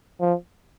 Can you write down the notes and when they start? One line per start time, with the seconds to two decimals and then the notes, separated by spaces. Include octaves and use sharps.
0.21 F3